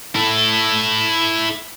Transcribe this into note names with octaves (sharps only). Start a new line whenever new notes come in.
E4 A4